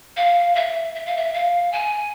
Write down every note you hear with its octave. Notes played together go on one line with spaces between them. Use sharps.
F5
E5
E5
F5
E5
F5
G#5